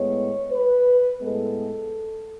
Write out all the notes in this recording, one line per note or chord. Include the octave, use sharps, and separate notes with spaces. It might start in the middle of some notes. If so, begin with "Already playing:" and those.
Already playing: A2 G#3 B3 C#5
B4
A2 G#3 B3 A4